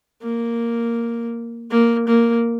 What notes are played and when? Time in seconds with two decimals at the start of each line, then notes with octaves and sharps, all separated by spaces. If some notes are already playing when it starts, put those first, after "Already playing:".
0.22 A#3
1.71 A#3
2.08 A#3